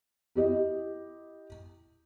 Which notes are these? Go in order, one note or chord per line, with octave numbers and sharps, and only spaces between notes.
E4 G4 D#5